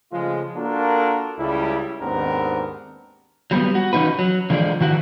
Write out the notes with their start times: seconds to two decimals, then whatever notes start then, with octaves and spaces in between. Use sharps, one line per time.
0.12 C#3 F3 G#3 A3 F4
0.55 A#3 D4 F4 F#4 A4 A#4
1.38 C#2 C#3 G3 E4
2.00 D#2 G#2 B3 C4 D4 A#4
3.51 F#3 G3 A#3 B3
3.75 F#4
3.93 E3 C#4 D#4 F#4 B4
4.19 F#3
4.50 D3 E3 F3 G#3 D5
4.81 D#3 E3 F#4